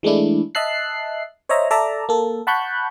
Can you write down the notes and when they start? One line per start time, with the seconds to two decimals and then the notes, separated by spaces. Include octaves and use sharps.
0.03 E3 G#3 A3 D4 E4
0.55 D#5 E5 A5 F#6 C7
1.49 C5 C#5 D#5 E5 A#5
1.71 A4 D5 E5 A5 A#5
2.09 A#3 A4
2.47 F#5 A5 B5 C#6 F#6 G6